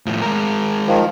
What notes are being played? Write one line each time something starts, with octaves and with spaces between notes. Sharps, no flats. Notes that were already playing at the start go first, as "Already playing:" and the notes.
A2 F3
G#3 A#4
D#3 F3